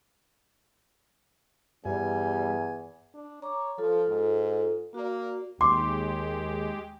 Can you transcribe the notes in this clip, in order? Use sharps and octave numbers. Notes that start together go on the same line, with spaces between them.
E2 G2 G3 G#5
D4
C#5 A#5 D6
F3 F4 A4
G#2
A#3 F#4 D5
D#2 G#3 G4 C6 D6